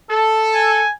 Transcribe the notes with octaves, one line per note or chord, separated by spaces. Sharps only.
A4
G#5